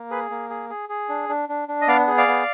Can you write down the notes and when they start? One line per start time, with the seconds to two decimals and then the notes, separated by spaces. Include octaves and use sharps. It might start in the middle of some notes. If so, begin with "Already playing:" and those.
Already playing: A#3
0.11 G#4 B4
0.30 A#3
0.50 G#4
0.70 G#4
0.89 G#4
1.09 D4
1.29 D4
1.49 D4
1.68 D4
1.81 D#5
1.88 B3 D5 F5
2.07 G#4
2.18 D5 F5
2.27 B3